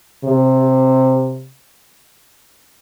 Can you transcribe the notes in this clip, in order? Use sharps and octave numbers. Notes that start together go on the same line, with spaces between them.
C3